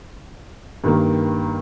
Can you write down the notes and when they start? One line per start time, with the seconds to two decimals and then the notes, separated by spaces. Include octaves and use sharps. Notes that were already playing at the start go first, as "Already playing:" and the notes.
0.84 G2 D#3 A#3